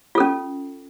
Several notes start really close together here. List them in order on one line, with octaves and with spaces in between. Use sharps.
F4 A4 C#4